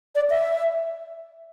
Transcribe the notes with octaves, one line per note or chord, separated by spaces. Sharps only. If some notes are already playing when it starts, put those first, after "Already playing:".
D5
E5